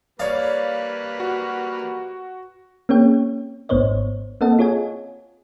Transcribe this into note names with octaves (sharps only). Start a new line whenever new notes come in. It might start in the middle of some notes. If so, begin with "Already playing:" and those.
G3 A#3 B4 C#5 D5 F5
F#4
A#3 C4 C#4 G#4 C#5 G5
G#1 G#2 B3 C5 C#5 D#5
A#3 C4 A4 D#5 F#5 A5
F4 G#4 C#5 D#5 G#5